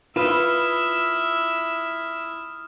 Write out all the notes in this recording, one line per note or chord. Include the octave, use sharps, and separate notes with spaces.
E4 F4 B4 E5 D#6 F6 E7